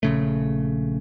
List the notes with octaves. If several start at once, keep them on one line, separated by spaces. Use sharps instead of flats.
A#1 C#3 A3